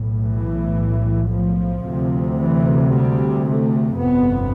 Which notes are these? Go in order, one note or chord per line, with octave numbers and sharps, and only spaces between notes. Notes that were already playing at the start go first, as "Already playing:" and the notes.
Already playing: B1 A2
E3
F3
D2 C3
E3
G3
A3
G1 F2 C3 B3